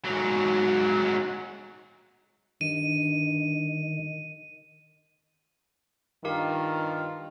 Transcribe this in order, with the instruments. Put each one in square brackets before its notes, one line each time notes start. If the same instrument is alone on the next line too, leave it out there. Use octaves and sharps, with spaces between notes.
[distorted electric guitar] G#2 F#3
[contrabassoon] G2 [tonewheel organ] D#3 [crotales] D#7
[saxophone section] G2 F4 [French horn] D#3 [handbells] G4 A#4 F5